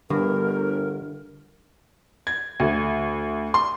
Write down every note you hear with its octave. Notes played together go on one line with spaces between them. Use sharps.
G1 G2 D3 A#4
G#6
D2
C6